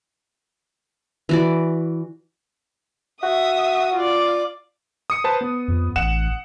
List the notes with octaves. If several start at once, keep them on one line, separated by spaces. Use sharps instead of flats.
E3 F#4 D5
F#4 E5 D#6
F4 D5
D#6 C#7
B4 C5 A5
B3
F2
A1 F#5 E7